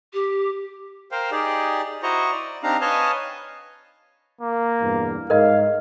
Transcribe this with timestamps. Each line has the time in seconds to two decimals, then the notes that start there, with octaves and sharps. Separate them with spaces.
0.13 G4
1.12 A#4 C5 F5 G5
1.31 D#4 G4 G#4 D5
2.03 E4 F#4 C5 D#5 A#5 C#6
2.32 D5
2.63 C4 D4 D#4 G4 F5 A#5
2.81 B4 C#5 D#5 F5 G#5 A5
4.41 A#3
4.80 E2 G2 B2
5.30 G#2 A#4 D#5 F5